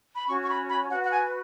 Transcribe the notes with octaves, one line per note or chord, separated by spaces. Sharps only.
B5
C#4 F#4 C#5 C#6
C#6
B5
B5
F#4 B4 F#5
F#5
G#5